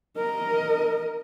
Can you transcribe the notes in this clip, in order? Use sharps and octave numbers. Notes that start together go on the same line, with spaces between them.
A#4 D#5